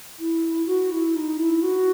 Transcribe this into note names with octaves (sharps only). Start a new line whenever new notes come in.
E4
F#4
E4
D#4
E4
F#4